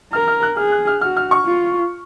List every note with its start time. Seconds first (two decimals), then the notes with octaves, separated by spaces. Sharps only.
0.13 A#4 F6
0.28 F6
0.43 F#6
0.57 G#4 F6
0.72 F#6
0.87 F6
1.01 F#4 F6
1.17 F6
1.31 C#6
1.46 F4